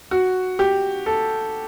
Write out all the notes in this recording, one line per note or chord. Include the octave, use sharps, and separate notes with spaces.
F#4
G4
A4